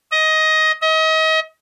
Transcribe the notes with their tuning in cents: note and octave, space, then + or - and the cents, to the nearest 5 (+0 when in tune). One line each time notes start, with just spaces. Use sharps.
D#5 +15
D#5 +35